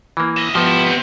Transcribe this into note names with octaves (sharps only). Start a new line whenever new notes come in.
E3 A#3
D#5 E5
F3 B3 G4
E4
C3